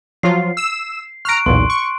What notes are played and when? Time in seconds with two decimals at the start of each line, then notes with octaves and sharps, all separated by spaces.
0.23 F3 F#3 F4 C7
0.57 E6 E7
1.25 A#5 C#6 F6 F#6 D7
1.46 B1 E2 A#2 C6
1.70 C#6